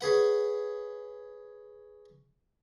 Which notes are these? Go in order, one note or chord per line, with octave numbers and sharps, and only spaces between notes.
C#4 G#4 B4 F#5